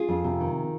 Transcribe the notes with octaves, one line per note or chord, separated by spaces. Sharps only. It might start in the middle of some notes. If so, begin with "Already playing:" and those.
Already playing: F4 G#4
F2
C3
D#3